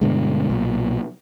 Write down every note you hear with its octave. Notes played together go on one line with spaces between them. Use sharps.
G2 B2 D3 G#3
B1 A#2